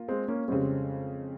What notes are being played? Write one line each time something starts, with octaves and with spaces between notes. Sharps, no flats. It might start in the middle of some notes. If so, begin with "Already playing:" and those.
Already playing: A#3 F4
G#3 C4
A#3 C#4
F2 C#3 G3 G#3 C4 C#4